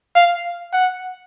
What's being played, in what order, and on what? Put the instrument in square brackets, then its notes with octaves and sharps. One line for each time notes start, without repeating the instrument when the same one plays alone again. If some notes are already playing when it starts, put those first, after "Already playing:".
[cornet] F5
F#5